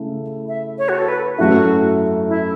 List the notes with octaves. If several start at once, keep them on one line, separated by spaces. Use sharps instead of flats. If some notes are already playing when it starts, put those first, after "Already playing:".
Already playing: C#3 A3 E4
E5
C#5
F#4
A4
B4
F#2 F#3 A3 E4 F#4
E4